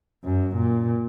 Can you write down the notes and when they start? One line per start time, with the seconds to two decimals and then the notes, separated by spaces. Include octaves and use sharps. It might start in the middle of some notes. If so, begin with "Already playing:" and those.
0.24 F#2
0.55 A#2